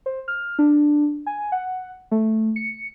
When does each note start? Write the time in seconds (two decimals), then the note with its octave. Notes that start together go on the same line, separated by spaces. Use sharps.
0.06 C5
0.28 F6
0.59 D4
1.26 G#5
1.52 F#5
2.11 A3
2.56 C#7